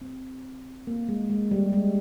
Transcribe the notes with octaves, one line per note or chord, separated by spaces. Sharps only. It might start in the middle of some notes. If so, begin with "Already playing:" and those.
C4
A#3
G#3
G#3
G3
G#3